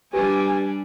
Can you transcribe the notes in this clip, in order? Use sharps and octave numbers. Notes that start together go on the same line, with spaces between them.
G3 D4 G4 B4 G#5